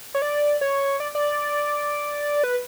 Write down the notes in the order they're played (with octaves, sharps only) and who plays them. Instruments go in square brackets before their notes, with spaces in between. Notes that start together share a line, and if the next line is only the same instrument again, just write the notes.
[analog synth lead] C#5
D5
C#5
D5
D5
B4